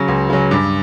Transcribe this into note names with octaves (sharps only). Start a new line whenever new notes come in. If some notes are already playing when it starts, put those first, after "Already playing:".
Already playing: C#3 F#3
C#2
C#3 F#3
G2